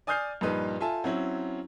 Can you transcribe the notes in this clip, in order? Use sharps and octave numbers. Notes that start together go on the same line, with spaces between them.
D5 G#5 D#6 F6 G6 C7
G2 A#2 F3 D#4 B4
F4 A4 E5 G#5 A5
F#3 C4 C#4 E4